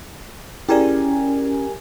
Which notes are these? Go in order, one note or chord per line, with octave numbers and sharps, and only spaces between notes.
C#4 E4 G4 G#4 A#4 D5 G#5